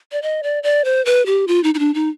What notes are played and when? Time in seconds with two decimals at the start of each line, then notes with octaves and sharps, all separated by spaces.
0.12 D5
0.22 D#5
0.43 D5
0.63 D5
0.85 C5
1.05 B4
1.26 G4
1.48 F4
1.63 D#4
1.74 D#4
1.79 D4
1.94 D#4